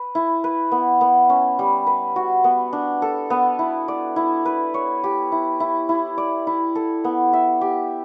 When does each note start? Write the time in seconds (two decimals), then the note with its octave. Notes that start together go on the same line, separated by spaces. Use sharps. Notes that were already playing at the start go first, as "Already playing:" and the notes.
Already playing: B4
0.15 E4
0.44 B4
0.72 B3
1.01 B3
1.30 C#4
1.59 G3
1.87 B4
2.16 F#4
2.44 B3
2.73 D4
3.02 A4
3.30 B3
3.59 E4
3.88 D5
4.16 E4
4.46 B4
4.74 C#5
5.04 G4
5.32 E4
5.60 E4
5.89 E4
6.18 D5
6.47 E4
6.75 A4
7.04 B3
7.33 E5
7.61 G4